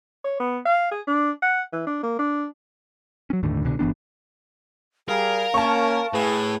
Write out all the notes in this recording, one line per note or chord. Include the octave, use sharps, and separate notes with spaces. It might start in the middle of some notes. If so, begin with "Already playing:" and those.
C#5
B3
F5
G#4
D4
F#5
E3
D4
A#3
D4
F#3 C#4
G1 D#2 A2 D3
C2 B2 D3
G1 E3 B3 D4
G3 G#4 A#4 F5
A#3 C#4 A5 C#6
A2 G#4 B4